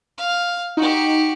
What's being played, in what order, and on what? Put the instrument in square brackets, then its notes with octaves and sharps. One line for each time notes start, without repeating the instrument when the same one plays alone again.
[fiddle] F5
[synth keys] D#4 [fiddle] F#4 G4